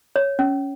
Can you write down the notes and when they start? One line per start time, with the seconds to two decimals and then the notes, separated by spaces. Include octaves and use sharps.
0.16 C#5
0.39 C#4